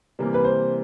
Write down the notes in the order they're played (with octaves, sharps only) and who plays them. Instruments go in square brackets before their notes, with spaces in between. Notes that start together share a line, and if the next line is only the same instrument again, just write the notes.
[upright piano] C3 E3 G3 A#3
[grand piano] B4
C5